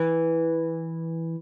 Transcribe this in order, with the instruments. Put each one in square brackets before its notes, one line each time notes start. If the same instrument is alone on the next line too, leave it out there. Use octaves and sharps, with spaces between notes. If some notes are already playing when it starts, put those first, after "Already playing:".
Already playing: [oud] E3